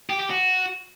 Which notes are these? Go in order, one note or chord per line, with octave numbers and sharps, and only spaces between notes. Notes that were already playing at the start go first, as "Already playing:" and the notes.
G4
G4
F#4